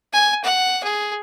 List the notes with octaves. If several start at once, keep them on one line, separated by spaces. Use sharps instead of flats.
G#5
F#5
G#4